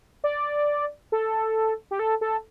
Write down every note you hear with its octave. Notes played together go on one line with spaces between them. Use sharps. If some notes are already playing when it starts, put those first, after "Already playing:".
D5
A4
G4
A4
A4